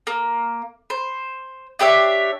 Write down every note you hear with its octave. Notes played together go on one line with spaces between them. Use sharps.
A#3
C5
D4 G4 C#5 E5